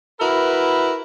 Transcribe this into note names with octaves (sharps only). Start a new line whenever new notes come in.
E4 F#4 A#4 B4